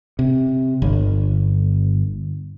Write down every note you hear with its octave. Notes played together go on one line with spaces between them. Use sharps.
C3
G1